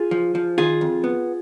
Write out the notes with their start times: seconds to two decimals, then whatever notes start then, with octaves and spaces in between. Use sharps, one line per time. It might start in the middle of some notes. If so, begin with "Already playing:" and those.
Already playing: F4 G#4
0.11 F3
0.35 F3
0.58 D#3 F4 G#4
0.81 F2
1.04 B3